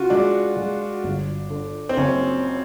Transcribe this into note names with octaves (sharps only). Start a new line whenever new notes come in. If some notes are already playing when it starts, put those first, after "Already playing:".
Already playing: C#3 F4 F#4
G#3 D4
G#3
G1
D3
C4
F#1 C#4